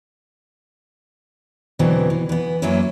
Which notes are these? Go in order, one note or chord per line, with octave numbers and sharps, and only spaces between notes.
B2 D3 E3 F#3 B3 C4
E3
E3 B3
F#2 E3 F#3 A#3 C#4 E4